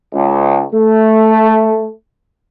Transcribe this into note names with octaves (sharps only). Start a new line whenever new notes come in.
C#2
A3